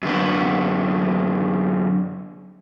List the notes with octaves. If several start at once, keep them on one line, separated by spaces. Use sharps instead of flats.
F#2 D3 B4